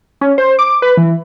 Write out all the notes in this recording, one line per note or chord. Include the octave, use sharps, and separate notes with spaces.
C#4
C5
D6
B4
E3